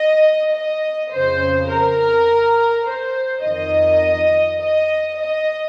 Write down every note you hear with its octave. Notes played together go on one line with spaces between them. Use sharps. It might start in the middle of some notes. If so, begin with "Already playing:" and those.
Already playing: D#5
D#5
F2 C#3 C5
A#4
C5
F2 D#3 D#5
D#5
D#5